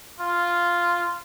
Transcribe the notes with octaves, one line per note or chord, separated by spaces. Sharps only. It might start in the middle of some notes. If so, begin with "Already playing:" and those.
F4